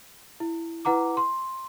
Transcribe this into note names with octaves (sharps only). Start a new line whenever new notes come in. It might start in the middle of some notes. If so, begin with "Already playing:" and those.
E4
E4 B4 F#5 A#5 D6
C6